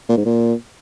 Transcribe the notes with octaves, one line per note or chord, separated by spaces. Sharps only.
A#2
G#2
A#2